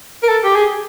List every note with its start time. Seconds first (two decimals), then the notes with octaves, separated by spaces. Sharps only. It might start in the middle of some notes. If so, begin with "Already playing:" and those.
0.23 A#4
0.28 A4
0.44 G4
0.55 G#4